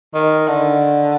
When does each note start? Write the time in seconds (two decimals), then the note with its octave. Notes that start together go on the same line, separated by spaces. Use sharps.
0.14 D#3
0.48 D3